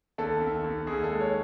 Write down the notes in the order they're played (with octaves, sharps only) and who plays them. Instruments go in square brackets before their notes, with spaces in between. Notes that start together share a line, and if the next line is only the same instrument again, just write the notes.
[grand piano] D#2 A4
D#2
D#2
D#2 G#4
A4
G#3
C#5